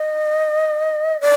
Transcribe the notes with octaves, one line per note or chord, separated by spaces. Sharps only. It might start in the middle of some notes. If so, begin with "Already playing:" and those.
Already playing: D#5
D5